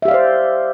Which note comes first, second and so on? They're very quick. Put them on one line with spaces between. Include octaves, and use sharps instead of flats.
E5 G4 F5 D5 C5